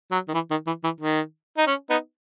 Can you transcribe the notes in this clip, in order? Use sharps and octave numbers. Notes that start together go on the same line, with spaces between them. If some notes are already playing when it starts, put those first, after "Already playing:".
F#3
D#3
E3
D#3
E3
E3
D#3
D#4
C#4
B3 D#4